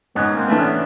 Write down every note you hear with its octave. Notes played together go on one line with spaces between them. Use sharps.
G#2 B3 C#4
A#3 C4
E3 A3 D4
B3 C#4